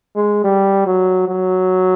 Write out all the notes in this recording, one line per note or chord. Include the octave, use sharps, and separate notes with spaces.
G#3
G3
F#3
F#3